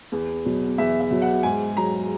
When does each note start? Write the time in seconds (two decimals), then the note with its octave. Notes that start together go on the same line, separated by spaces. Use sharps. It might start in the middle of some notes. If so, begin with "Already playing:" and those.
0.12 E2
0.45 B2 F#3
0.78 E2 E5
1.00 E5
1.11 B2 F#3
1.22 F#5
1.43 G#2 G#5
1.77 F#3 A#5